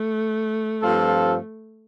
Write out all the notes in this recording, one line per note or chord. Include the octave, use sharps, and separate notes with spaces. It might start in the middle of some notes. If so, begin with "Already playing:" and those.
Already playing: A3
G2 F3 C4 F4 A4